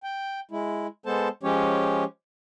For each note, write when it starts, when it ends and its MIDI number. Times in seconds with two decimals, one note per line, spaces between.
0.03 0.40 79
0.51 0.87 56
0.51 0.87 64
1.06 1.28 56
1.06 1.28 59
1.06 1.28 69
1.06 1.28 72
1.06 1.28 81
1.43 2.04 53
1.43 2.04 56
1.43 2.04 61
1.43 2.04 67
1.43 2.04 73